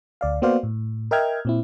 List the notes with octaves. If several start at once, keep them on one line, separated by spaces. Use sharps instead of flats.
D2 D5 F5
A#3 B3 F#4 C5 D5 F5
A2
A#4 D#5 E5 G5 F6 G#6
A#2 C4 E4